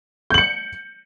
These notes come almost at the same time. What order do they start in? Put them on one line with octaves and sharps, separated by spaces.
G6 F#7 C#7